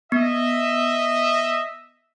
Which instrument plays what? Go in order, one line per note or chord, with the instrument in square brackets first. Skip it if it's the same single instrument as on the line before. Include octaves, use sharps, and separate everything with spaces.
[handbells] B3 [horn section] D#5 E5